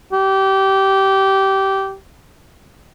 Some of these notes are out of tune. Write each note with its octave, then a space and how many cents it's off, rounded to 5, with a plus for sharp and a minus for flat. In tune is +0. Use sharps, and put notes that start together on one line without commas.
G4 -20